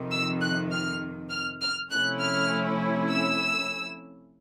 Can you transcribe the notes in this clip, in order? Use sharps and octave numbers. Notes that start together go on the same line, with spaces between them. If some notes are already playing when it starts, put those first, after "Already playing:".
Already playing: F2 C3 D#3
E6
F#6
F6
F6
F6
C3 F3 A3 C#4 E4 F#6
F6
E6